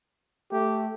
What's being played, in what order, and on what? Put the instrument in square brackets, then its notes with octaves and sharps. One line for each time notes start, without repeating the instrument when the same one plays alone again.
[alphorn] A3 [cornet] G4